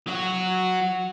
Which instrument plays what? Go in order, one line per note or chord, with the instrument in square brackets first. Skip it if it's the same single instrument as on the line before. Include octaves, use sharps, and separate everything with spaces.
[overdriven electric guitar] F#3 F#4